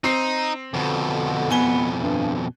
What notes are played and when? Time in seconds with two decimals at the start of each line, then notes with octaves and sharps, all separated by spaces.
0.04 C4 D#4 C7
0.74 F2 B2 D3
1.50 B3 G#5 G7
2.02 G2